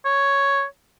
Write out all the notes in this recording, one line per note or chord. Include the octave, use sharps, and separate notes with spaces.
C#5